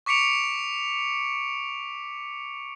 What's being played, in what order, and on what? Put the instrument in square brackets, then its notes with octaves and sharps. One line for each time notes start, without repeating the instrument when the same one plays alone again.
[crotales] C#6 D6 B6 C#7 D7 F7